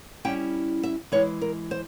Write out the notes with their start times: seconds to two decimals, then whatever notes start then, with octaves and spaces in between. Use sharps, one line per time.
0.25 G3 C#4 E4 G5
0.83 E5
1.12 E3 G#3 E4 C#5
1.41 A#4
1.71 C5